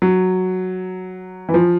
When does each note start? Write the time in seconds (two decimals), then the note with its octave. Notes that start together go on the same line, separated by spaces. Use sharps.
0.02 F#3
1.49 E3
1.54 F3